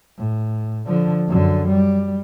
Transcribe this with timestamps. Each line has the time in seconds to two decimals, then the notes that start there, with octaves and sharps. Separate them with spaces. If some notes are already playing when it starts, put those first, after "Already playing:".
0.18 A2
0.86 D3 F3
1.28 F#2 D3
1.68 G3